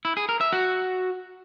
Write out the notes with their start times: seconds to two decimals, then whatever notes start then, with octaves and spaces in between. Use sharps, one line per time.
0.05 E4
0.17 G#4
0.29 A#4
0.41 E5
0.53 F#4